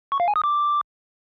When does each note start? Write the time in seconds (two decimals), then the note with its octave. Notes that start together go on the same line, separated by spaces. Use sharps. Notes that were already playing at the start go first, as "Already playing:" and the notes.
0.12 C#6
0.20 F5
0.28 G#5
0.36 D#6
0.44 D6